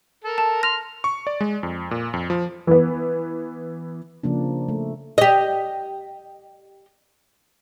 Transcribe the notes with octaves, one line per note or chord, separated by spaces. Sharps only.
A4 A#4
A5
C6 F6 A#6
C#6
D5
G#3
F2
A#2
F2
F3
E3 B3
C#3 F3 A#3 D4
A3
G4 D#5